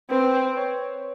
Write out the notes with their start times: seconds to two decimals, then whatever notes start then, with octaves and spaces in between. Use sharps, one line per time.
0.10 C4 B4
0.57 C#5